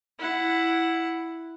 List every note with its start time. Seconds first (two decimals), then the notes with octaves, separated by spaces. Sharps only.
0.19 E4 F#5